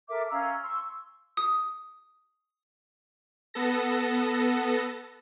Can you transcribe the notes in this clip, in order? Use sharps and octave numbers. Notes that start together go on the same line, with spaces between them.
A4 A#4 E5 D6
C#4 F5 A#5 E6
C6 C#6 E6
D#6
B3 A4 A#6